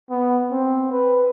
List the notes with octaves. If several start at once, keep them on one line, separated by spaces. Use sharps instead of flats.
B3
C4
B4